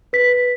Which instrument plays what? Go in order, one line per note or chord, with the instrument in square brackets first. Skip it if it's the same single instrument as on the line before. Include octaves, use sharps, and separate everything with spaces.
[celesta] B4 B6